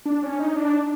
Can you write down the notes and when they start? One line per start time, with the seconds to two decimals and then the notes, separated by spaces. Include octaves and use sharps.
0.06 D4
0.23 C#4
0.40 D#4
0.56 D4